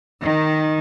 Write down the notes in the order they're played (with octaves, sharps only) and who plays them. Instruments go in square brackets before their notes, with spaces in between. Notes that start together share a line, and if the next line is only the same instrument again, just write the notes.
[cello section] D#3